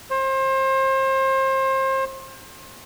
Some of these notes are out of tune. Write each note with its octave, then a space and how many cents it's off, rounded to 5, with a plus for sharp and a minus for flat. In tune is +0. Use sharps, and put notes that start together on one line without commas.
C5 +30